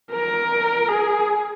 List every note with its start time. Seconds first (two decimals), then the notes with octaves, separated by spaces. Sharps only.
0.12 A#4
0.88 G#4